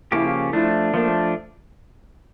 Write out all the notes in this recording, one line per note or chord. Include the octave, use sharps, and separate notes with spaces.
C#3 F3 A#3 C#4 E4 G4
F3 A3 D4 E4
F3 A3 A#3 D4